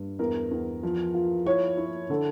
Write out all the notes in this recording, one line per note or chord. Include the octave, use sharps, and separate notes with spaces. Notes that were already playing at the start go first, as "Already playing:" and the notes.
Already playing: G2
E2 A#4
E2
F3
F4
E4 C#5
E4
D3 A4